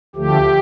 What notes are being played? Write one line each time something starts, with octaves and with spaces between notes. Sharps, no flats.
D2 D3 F3 A3 G4